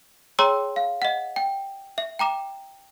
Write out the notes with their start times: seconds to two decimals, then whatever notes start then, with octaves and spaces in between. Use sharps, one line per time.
0.39 G#4 C#5 G5 A#5 C6 E6
0.76 F5
1.02 D#5 F#5
1.36 G5
1.98 E5
2.19 G5 A#5 D6 E7